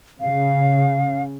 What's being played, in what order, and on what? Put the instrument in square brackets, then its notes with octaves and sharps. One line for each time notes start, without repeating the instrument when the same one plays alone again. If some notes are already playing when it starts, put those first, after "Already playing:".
[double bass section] C#3 [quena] F5